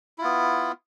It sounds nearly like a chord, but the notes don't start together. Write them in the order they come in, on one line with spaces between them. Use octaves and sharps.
E4 F4 B3